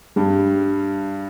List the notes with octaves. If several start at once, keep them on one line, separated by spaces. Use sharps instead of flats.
G2 G3